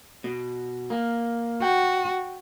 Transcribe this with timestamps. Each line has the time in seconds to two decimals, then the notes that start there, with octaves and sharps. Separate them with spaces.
0.24 B2
0.90 A#3
1.62 F#4 G5